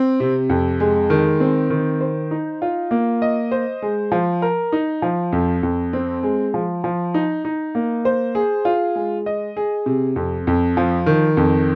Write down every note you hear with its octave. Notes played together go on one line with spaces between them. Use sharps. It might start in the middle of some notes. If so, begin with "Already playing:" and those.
Already playing: C4
C3
F2
G#3
D#3
C4
D#3
C5
D#4
F4
A#3
D#5
C5
G#3
F3
A#4
D#4
F3
F2
F2
C4
G#3
F3
F3
D#4
D#4
A#3
C5
G#4
F4
G#3
D#5
G#4
C3
F2
F2
F3
D#3
F2